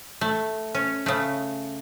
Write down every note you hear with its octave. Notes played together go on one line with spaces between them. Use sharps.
A3
C#4
C#3 A3